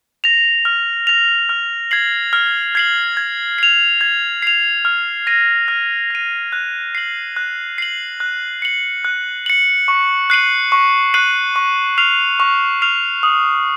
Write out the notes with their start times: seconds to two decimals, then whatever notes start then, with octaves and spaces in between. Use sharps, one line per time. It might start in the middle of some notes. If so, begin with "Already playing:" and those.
0.24 A#6 F7
0.65 F6
1.07 A#6 F7
1.49 F6
1.91 G#6 C7 F#7
2.33 F6
2.75 G#6 C7 F#7
3.17 G#6
3.58 C7 F7
4.01 G#6
4.42 C7 F7
4.85 F6
5.27 A#6 D#7
5.68 F6
6.10 A#6 D#7
6.52 F#6
6.95 C7 F#7
7.36 F#6
7.78 C7 F#7
8.20 F#6
8.62 C#7 F#7
9.05 F#6
9.46 C#7 F#7
9.88 C#6
10.30 F#6 C7 D#7 F#7
10.72 C#6
11.14 F#6 C7 D#7 F#7
11.56 C#6
11.98 F6 C7 F7
12.40 C#6
12.82 F6 C7 F7
13.23 D#6